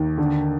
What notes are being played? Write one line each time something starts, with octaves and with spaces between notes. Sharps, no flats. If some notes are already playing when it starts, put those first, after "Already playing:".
Already playing: D#2
D3